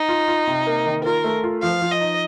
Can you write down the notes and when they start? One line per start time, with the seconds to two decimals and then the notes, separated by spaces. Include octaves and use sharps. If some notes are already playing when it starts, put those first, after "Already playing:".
Already playing: D#4
0.09 F4
0.28 F4
0.47 C3
0.67 A#3
0.86 D#3
1.04 F4 A#4
1.24 A3
1.44 F4
1.63 F3 F5
1.82 F3
1.91 D#5
2.01 D#4